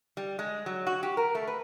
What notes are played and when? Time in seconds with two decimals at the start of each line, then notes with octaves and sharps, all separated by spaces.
0.17 G3
0.39 G#3
0.66 F#3
0.87 F#4
1.03 G4
1.17 A#4
1.35 A3
1.47 B4